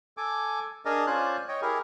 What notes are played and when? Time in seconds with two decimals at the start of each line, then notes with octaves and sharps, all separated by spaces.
0.17 A4 G#5 D6
0.85 D4 G#4 A#4 D5 D#5
1.07 C#4 F4 C5 D5 G#5 F#6
1.48 C#5 D#5 G5
1.62 E4 G4 G#4 A#4